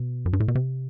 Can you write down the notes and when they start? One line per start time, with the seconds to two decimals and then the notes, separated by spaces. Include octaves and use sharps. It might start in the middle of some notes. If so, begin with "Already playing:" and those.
Already playing: B2
0.26 F#2
0.33 G2
0.40 A2
0.48 B2
0.55 C3